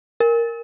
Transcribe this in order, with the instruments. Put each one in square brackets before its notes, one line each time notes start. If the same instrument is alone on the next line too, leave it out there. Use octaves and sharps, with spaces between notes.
[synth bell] A#4